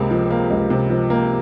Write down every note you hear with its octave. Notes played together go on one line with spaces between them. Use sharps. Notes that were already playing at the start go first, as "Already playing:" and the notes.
Already playing: C#2 C3 A#3
F3
A#3
C#2
C3
F3
A#3